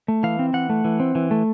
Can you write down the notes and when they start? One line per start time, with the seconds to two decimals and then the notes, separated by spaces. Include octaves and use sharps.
0.08 A3
0.23 E3 F5
0.39 C4
0.53 E3 F#5
0.70 A3
0.85 E3
1.00 C4
1.15 E3
1.31 A3